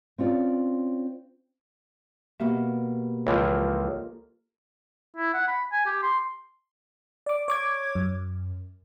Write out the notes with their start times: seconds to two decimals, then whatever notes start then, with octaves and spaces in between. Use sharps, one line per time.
0.18 C4 C#4 F4 D5
2.40 B2 A#3 G4 E5
3.27 C#2 E3 F3 F4 A4 A#4
5.16 E4
5.34 F#5
5.48 B5
5.72 G#5
5.86 G4
6.03 C6
7.26 D5 D6
7.48 C#5 D6 G#6
7.95 F#2